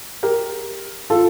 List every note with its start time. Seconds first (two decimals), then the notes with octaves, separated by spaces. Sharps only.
0.23 G4 A#4
1.10 F4 A4